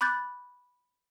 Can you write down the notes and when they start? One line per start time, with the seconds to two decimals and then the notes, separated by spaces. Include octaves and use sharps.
0.01 B5 D6 F#6 G6 A6